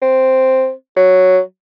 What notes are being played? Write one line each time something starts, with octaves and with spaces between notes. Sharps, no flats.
C4
F#3